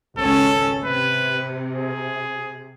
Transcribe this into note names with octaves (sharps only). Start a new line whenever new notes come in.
G#1 C#2 C#4 A4
C3 B4
G#4